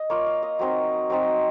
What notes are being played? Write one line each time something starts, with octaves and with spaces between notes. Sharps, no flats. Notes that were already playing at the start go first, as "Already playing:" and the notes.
Already playing: D#5
A#3 F4 C#5
F5
D#5
F#3 C4 D#4 C#5
F#3 C4 D#4